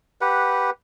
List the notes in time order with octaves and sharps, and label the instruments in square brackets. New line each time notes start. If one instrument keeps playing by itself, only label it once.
[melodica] G4 B4 F#5